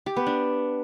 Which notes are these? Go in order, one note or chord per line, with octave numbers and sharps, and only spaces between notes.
G4
B3
D4